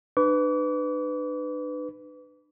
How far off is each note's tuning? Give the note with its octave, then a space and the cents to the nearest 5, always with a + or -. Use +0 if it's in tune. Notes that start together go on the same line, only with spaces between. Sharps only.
D4 +40 B4 +15 D6 -40